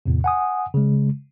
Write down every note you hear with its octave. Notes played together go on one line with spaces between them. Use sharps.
E2 A2 C3
F#5 G#5 D#6
C#3 G#3